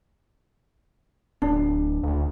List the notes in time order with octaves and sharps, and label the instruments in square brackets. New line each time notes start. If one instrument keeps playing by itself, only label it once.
[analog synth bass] D1 [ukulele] D4
[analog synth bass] D2